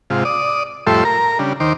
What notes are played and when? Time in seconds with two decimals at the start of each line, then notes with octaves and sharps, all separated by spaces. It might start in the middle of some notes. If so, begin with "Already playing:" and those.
0.10 G#2 C3 F4
0.25 D5 D#6
0.87 F2 A2 G3 A4 E5 C6
1.05 A#4 A#5
1.39 C#3 G3 D4
1.60 D#2 D#3 C5 D6